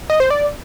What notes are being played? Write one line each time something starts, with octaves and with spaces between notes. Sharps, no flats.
D#5
C5
D5